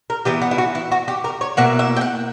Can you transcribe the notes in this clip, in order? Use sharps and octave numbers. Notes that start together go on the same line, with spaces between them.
A#4
E3 B3 E4 G4
F#4
E4
F#4
E4
F#4
G4
A#4
C#5
B2 A#3 E4 F#5
E5
G5
F#5